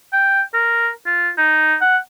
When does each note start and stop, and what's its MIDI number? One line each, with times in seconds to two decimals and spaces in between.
0.13 0.42 79
0.54 0.90 70
1.06 1.29 65
1.37 1.76 63
1.81 1.97 78